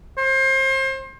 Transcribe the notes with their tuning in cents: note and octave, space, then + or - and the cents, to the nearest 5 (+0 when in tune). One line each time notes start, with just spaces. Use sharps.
C5 +30